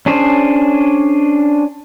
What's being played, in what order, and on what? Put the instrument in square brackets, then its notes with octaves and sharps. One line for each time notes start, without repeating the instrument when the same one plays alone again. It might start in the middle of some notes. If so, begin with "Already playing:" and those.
[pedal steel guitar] C#4 D4 G#4 C5